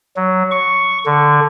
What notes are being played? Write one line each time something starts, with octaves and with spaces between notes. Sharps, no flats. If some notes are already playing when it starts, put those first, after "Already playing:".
F#3
C#6
D3